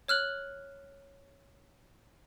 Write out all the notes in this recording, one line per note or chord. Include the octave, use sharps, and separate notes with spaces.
C#5 F6 F#6 F#7